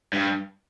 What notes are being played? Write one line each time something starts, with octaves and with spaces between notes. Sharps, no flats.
G2